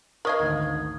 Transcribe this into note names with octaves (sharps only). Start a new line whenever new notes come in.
A#4 D#5 F5 C#6 D#6 G#6
G#1 D2